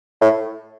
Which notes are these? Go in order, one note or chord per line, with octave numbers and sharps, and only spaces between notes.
A2